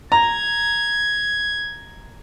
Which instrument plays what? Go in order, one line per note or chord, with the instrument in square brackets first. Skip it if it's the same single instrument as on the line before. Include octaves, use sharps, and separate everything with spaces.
[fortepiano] A#5 [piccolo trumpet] G#6